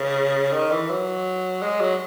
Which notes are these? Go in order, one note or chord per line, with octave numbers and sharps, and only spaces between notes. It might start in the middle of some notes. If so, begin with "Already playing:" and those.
Already playing: C#3
D#3
E3
F#3
G#3
F#3